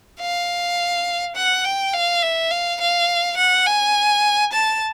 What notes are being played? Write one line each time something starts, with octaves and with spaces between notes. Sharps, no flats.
F5
F#5
G5
F5
E5
F5
F5
F#5
G#5
A5